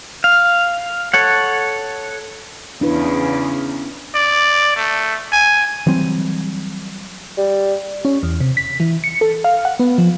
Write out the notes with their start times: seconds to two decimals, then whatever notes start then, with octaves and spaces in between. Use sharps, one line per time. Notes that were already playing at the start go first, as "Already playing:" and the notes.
0.24 F5
1.13 A4 C#5 F#5
2.81 E2 C#3 D4 E4 B4
4.15 D5
4.76 A3
5.32 G#5
5.86 E3 F#3 G3 C4
7.38 G3
8.05 C#4
8.23 E2
8.40 C3
8.57 B6
8.80 E3
9.04 C#7
9.21 A4
9.44 F5
9.65 F#5
9.79 B3
9.98 F3